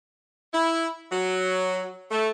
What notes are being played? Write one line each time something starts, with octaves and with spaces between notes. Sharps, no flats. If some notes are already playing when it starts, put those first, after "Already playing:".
E4
F#3
A3